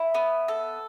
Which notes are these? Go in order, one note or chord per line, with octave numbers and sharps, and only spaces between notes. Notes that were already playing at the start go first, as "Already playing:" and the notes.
Already playing: E4
B3
A4